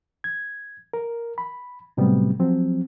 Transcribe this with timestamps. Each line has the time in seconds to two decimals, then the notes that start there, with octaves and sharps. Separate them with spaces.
0.24 G#6
0.93 A#4
1.38 B5
1.97 A2 C3 F#3 G3 A3 B3
2.39 F3 F#3 C4